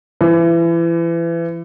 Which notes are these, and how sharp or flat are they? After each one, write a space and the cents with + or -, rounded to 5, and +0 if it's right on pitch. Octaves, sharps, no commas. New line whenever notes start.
E3 +30